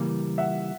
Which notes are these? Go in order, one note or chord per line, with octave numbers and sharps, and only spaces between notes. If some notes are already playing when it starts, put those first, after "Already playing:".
Already playing: C#3 E3 G3 A#3
E5 F#5